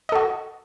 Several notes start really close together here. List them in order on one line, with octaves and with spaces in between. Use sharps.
D#5 A4 F#4